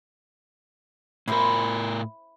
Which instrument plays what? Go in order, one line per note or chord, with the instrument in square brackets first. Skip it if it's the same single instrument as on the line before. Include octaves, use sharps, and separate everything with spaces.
[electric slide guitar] A2 A#4 [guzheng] E4 C5